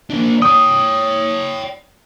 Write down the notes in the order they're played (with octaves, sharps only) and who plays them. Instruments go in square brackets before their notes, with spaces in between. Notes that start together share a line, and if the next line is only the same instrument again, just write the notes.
[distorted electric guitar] A#3 D4
[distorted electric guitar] C#5 G5 [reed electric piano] D#6